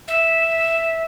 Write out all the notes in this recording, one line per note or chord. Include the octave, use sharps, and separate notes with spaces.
E5